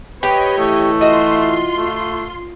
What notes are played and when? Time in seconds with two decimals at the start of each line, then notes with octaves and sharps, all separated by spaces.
0.23 G4 B4 C#5 D#5 G5
0.58 E3 A3 E4
1.01 F4 F#4 D#5 C6
1.77 A3